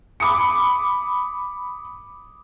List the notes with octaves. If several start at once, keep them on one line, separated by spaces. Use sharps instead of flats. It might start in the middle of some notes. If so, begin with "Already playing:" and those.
B5 D6 D#6 C#7